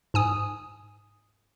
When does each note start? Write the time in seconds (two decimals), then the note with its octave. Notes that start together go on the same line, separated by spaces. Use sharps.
0.14 G#2 G#5 D#6